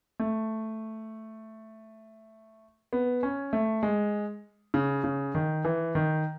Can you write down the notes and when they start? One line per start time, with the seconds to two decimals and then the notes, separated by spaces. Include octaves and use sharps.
0.20 A3
2.93 B3
3.23 C#4
3.53 A3
3.83 G#3
4.74 C#3
5.04 C#3
5.35 D#3
5.65 E3
5.95 D#3